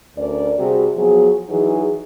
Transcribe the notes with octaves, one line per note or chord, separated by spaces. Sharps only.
D2 C#4 A#4 D5
C3 G3 C4 F#4 G#4
F3 F#3 B3 G#4
E3 F#3 D#4 G#4